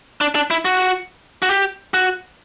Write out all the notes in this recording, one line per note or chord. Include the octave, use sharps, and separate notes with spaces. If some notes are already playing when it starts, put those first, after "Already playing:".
D4
D4
E4
F#4
F#4
G4
F#4